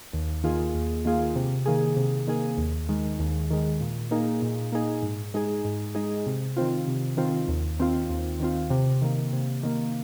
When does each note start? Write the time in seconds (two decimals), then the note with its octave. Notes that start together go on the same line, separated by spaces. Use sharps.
0.13 D#2
0.44 D#3 A#3 F4 G#4
0.75 D#2
1.05 D#3 A#3 F4 G#4
1.36 C3
1.66 D#3 A#3 G#4
1.97 C3
2.27 D#3 A#3 G#4
2.58 D#2
2.89 D#3 G#3
3.19 D#2
3.51 D#3 G#3
3.81 A#2
4.11 A#3 D#4 G#4
4.42 A#2
4.72 A#3 D#4 G#4
5.03 G#2
5.34 G#3 D#4 G#4
5.65 G#2
5.95 G#3 D#4 G#4
6.26 C3
6.57 D#3 C4 F4
6.88 C3
7.17 D#3 C4 F4
7.48 D#2
7.79 D#3 C4 F4
8.10 D#2
8.40 D#3 C4 F4
8.70 C3
9.02 D#3 A#3
9.33 C3
9.63 D#3 A#3